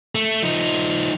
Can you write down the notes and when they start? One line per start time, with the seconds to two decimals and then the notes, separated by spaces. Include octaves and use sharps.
0.15 A3
0.42 F3 D#4